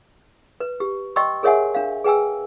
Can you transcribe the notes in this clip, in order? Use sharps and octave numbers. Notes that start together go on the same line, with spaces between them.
B4
G4
D#5 G5 C6 C#6 E6
G#4 A#4 C#5 E5 F#5 G#5
D4 F5
G#4 B4 G5 G#5 E6